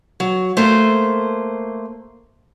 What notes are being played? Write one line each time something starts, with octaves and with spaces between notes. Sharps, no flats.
F#3
A3 A#3 C5